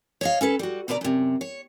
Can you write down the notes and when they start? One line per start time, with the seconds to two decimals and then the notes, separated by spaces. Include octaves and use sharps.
0.21 C#5 D#5 F5
0.41 C#4 A4 B4
0.59 G3 F#4
0.88 D2 B2 B4 D5 A#5
1.01 F#2 C3
1.41 C#5